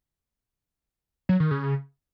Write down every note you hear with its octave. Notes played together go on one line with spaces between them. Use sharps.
F#3
D#3
C#3